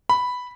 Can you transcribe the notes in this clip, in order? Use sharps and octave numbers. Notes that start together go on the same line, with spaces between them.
B5